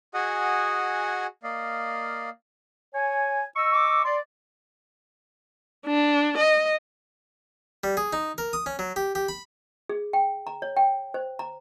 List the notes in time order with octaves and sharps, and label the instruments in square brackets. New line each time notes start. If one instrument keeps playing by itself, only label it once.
[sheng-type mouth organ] F#4 G#4 D#5 F#5 G#5
A#3 D5 D#5 F5
[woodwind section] C#5 G#5
D#5 C#6 E6
[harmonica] D6
[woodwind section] D5 [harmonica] C6
[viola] D4
D#5
[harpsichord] G3
G#4
D#4
A#4
D#6
C#4
F#3
G4
G4
B5
[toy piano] G#4
G5
A#5
C#5
G5
C5
A#5